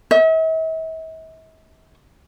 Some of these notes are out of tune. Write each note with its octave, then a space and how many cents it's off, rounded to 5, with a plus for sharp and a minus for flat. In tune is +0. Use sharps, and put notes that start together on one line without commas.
E5 -45